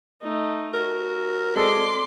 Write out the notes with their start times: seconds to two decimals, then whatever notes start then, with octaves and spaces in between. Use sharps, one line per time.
0.22 A3 D#4
0.73 F#4 A#4
1.56 G#3 C4 A4 D5 C6 D6